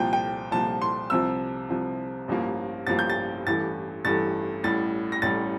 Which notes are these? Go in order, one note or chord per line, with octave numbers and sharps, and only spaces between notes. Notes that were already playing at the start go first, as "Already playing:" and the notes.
Already playing: C2 A#2 F3 G5
G5
C2 A#2 F3 A5
C6
C2 C3 F3 E6
C2 C3 F3
A1 G2 F3 A#3
A1 G2 F3 A#3 A6
G6
A6
A1 G2 E3 A3 A6
A1 G2 E3 A3 A6
A1 A2 G3 A6
A#6
A1 A2 G3 A6